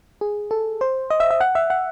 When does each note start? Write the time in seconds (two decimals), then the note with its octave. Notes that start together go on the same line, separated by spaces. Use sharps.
0.21 G#4
0.51 A4
0.81 C5
1.10 D#5
1.20 E5
1.31 E5
1.41 F#5
1.55 E5
1.70 F#5